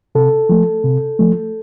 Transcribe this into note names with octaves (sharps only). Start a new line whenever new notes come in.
C3 A4
F3 A3
C3
F3 A3